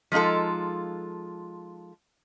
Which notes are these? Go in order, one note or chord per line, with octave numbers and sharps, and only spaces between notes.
F3 G#3 D#4 F4 A4